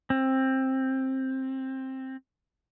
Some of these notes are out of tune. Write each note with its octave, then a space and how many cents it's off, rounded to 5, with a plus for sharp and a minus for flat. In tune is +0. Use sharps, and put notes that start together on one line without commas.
C4 +15